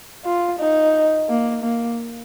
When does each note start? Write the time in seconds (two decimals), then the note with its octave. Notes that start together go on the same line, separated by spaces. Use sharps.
0.25 F4
0.59 D#4
1.28 A#3
1.63 A#3